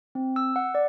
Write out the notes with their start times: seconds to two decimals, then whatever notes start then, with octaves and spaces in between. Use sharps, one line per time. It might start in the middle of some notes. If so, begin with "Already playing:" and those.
0.15 C4
0.36 E6
0.56 F#5
0.75 D5